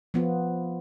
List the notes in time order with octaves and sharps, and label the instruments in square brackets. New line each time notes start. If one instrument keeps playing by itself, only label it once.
[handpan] F3 B3 F4